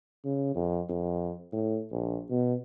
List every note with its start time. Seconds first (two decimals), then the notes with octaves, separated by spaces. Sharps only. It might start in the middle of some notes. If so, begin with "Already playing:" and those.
0.25 C#3
0.55 F2
0.89 F2
1.52 A2
1.92 A#1
2.30 B2